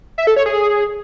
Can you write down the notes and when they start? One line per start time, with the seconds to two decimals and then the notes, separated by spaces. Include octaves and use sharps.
0.18 E5
0.27 A4
0.36 C#5
0.46 G#4